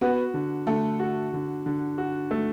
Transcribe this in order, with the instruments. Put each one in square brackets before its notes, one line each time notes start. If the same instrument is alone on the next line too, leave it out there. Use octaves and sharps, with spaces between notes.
[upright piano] B3 B4 [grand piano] F#4
[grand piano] D3
[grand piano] D3 [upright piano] A3 A4
[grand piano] F#4
D3
D3
F#4
A3